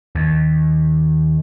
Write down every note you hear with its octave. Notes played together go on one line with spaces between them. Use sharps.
D#2